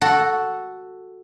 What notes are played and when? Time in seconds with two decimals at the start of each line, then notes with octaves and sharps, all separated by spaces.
0.01 F#4 A4